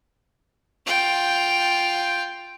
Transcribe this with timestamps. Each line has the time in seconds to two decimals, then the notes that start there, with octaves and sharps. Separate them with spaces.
0.86 F4 G5